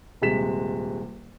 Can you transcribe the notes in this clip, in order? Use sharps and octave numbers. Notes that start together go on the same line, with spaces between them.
D#1 C3 G#3 B6 E7